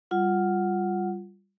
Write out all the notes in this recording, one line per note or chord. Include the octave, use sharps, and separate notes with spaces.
G3 F4 F#5